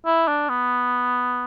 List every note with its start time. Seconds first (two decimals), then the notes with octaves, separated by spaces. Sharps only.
0.06 E4
0.28 D4
0.49 B3